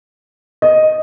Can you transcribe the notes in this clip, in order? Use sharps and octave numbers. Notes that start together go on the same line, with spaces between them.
D#5